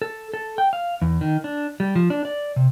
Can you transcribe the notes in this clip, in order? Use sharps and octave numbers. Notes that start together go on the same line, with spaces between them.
A4
A4
G5
F5
E2
D#3
D4
G3
F3
D4
D5
C3